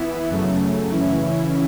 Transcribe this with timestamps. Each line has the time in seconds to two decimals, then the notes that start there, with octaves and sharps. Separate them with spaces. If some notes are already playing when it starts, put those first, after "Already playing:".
Already playing: E3 B3 E4
0.30 F#2 C#3 F#3 A3
0.91 C#3 E3 C#4 E4